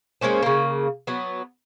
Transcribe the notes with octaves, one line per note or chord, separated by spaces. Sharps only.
G#3 A#3 C#4 C5
C#3 A#3
F#3 B3